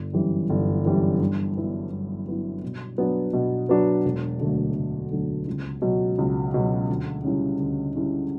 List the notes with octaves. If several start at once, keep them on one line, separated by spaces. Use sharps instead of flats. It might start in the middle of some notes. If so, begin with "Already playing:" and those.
Already playing: G1
F#2 E3 G3
G1
F#2 E3 G3
G2
F#3 B3 E4
G2
F#3 B3 E4
B2
F#3 B3 D4 F#4
B2
F#3 B3 D4 F#4
E1
D2 D3 F#3 A3
E1
D2 D3 F#3 A3
C#2
B2 F#3
C#2
B2 F#3
D2
C#3 G3 C#4 E4
D2
C#3 G3 C#4 E4